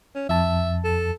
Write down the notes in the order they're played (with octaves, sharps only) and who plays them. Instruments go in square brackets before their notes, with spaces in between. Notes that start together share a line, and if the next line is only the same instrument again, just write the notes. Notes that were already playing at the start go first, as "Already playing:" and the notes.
[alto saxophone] C#4
[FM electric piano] F2 A5 [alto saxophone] E5
[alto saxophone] A4